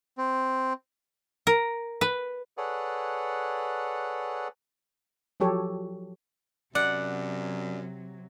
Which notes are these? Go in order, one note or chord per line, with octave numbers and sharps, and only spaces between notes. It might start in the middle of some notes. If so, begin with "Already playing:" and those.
C4
A#4
B4
G#4 A4 B4 C#5 D5 F#5
F3 F#3 G4 A4 C#5
F#2 C3 F#3 D5 F#5